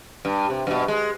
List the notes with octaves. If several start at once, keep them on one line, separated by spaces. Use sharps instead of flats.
G2
C3
G2 B2
G#3